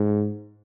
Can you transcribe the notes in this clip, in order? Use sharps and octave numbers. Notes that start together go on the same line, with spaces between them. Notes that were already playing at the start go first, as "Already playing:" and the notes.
Already playing: G#2